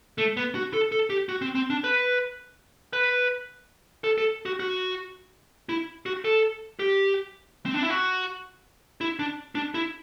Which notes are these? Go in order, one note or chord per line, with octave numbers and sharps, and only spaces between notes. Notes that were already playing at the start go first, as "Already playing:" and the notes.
A3
B3
F#4
A4
A4
G4
F#4
C4
C4
D4
B4
B4
A4
A4
F#4
F#4
E4
F#4
A4
G4
C4
D4
E4
F#4
E4
D4
D4
E4